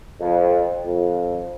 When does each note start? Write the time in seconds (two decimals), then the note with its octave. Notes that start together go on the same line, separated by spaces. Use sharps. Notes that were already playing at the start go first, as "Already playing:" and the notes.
0.20 F2
0.86 F2